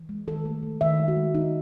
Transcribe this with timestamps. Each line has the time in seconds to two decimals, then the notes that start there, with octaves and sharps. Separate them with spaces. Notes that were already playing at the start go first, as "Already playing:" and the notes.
Already playing: E3
0.09 G#3
0.27 D#3 A4
0.45 A3
0.63 A3
0.81 D#3 E5
0.99 G#3
1.08 F#4
1.16 G#3
1.34 G#3 D#4